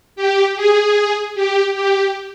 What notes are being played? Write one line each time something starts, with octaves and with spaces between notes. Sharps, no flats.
G4
G#4
G4
G4